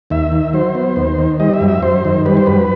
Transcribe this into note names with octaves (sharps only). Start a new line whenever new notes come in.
D#2 E5
D#3
F#3 C5
B3
D#2
D#3
G3 D#5
E5
F#2
E5
F#2 C5
D#3
G3 B4
C5
F#2 B4